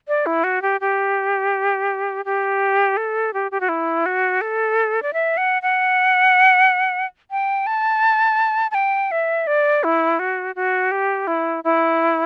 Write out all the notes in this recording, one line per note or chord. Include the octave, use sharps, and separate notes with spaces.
D5
E4
F#4
G4
G4
G4
A4
G4
G4
F#4
E4
F#4
A4
D5
E5
F#5
F#5
G5
A5
A5
G5
E5
D5
E4
F#4
F#4
G4
E4
E4